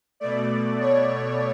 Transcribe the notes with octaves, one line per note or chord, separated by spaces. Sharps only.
B2 A3 D5
C#5